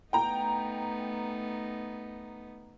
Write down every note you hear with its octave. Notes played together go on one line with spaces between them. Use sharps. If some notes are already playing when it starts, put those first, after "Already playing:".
A3 B3 D#4 G5 A#5